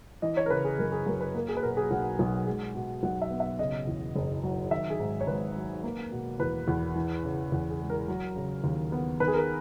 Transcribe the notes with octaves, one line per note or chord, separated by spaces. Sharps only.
E3 D#5
C#5
A#4
C#3 B4
G#4
F#2 A#4
G#4
F#2 A#4
B4
A#3 A#4
G#4
B4
B2 A#4
G#4
B1 F#5
B1
G#3
B2
B1 F#5
E5
B3
E5
C#3 D#5
E2
F#1
F#3
D#3 E5
G#4
G#2
C#5
G#1 B4
F#3
A#3
B2
E2 B4
E2
E3
C#3
E2
G#4
G#3
A#4
F#3
C#3
D#2
B3
D#3 B4
G#4
A#4